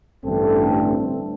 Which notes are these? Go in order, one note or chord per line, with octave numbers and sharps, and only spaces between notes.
A1 G2 D3 A3 C4 A4